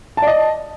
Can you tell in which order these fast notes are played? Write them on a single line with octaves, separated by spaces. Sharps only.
A5 D5 D#5